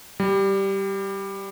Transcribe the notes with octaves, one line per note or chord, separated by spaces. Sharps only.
G3